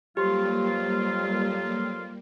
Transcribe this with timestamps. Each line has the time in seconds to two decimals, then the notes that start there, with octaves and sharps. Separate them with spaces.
0.17 F2 F#3 G3 A#3 F4 G4 C6